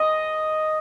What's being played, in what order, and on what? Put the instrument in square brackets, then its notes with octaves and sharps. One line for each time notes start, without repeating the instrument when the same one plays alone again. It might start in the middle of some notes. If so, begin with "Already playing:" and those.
Already playing: [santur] D#5